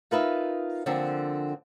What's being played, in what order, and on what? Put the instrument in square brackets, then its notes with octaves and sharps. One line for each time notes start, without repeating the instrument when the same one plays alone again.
[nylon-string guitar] D#4 F4 A#4 B4 D#5 E5
D3 F3 A#3 C4 D4